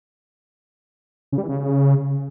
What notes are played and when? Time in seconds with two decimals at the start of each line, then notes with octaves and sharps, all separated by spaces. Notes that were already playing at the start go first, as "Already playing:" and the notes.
1.32 C#3
1.38 G3
1.43 E3
1.49 C#3